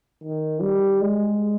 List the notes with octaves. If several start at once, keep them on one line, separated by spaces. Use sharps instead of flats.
D#3
G3
G#3